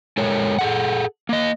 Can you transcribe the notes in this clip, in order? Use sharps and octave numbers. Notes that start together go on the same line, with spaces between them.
G#3 A4 A#4 C#5
G#4 A4 F#5
A#3 D#5